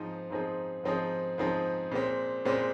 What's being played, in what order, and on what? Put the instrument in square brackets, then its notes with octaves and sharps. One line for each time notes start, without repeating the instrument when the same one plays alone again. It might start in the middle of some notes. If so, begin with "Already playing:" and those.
Already playing: [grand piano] G#2 F3 C4 D#4 G#4
G#2 F3 C4 D#4 G#4
G#2 F3 C4 D#4 G#4
G#2 F3 C4 D#4 G#4
A#2 G#3 C4
A#2 G#3 C4